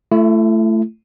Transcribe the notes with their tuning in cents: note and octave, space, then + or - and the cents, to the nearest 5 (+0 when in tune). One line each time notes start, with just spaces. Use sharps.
A3 +0 E4 +40